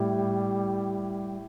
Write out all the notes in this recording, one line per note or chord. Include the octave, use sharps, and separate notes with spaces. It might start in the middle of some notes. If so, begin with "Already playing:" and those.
Already playing: A2 G3